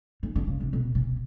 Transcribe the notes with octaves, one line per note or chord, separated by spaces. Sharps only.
D#3
D3
C#3
C3
B2
B2